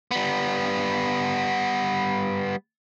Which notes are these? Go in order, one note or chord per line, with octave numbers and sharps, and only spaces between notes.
G3 B3